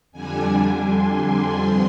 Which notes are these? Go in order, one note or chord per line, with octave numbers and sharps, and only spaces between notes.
F2 D3 G3 D4 G#5
G#5
C6
G2 F3 C4